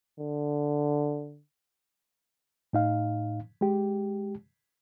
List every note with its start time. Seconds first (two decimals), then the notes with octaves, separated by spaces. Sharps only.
0.20 D3
2.73 A2 D#4 F5
3.61 G#3 G4